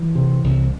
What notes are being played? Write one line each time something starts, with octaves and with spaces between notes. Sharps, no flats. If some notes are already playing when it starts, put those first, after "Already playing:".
Already playing: E3
C3
C2